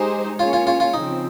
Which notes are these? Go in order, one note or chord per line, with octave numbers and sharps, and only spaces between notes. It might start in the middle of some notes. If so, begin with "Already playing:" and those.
Already playing: G#3 D#4 G4 G#4 C5
A#3 C#4 F4 G#4 C#5
F4
F4
F4
C#3 F3 C4 D#4